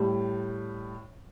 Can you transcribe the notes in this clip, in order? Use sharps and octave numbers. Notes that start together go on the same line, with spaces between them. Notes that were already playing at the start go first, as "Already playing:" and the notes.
Already playing: A2 G3